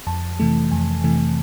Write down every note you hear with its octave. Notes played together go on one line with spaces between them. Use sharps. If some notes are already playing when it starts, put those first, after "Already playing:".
F2 A5
C3 E3 A3
F2 G#5
C3 E3 A3